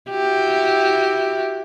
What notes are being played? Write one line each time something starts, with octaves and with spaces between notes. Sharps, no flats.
E4 F#4 G4